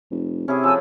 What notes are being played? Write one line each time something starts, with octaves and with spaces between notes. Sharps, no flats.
F1
C3 C#4 E4 G#4
F3 A3 G#5 E6